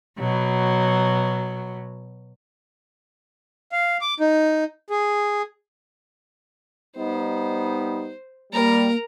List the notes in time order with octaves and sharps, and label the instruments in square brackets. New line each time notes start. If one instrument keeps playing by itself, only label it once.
[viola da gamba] B2 F#3
[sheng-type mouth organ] F5
D6
D#4
G#4
[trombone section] G3 B3 D#4 [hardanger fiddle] C5
[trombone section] G3 [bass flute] A#3 [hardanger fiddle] A#4 A#5